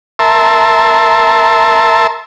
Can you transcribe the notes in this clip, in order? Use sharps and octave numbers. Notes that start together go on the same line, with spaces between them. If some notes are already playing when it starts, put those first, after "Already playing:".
A#4 E5 A5 C6